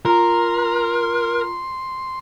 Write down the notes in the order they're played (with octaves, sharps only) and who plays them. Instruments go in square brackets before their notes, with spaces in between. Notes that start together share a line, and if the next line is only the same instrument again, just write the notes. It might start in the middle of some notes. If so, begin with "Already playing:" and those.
[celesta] F4 A#5 [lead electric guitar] A#4 [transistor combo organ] C6